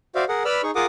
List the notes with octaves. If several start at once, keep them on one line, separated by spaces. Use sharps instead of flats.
F#4 C5 D5 E5 F5
G#4 A#4 F#5
B4 D5 B5 E6 F6
D#4 G#4 C#6
F4 G#4 A#4 F#5 D6 D#6